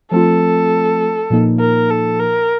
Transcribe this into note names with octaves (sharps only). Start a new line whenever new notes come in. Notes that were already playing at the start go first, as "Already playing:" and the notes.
F3 A3 C4 F4 A4
A#2 F3 A#3 D#4
A#4
A4
A#4